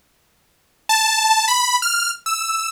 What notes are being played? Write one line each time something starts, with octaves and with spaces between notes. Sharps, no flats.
A5
B5
F6
E6